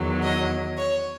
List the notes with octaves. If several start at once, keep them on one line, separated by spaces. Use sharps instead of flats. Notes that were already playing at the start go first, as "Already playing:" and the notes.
Already playing: E2 D#3 F#3
D#5
C#5